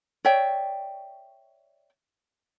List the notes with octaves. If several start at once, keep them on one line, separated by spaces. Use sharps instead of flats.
C#5 D5 E5 G5